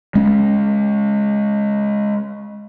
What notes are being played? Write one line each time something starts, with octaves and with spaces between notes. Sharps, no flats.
G#3 C#4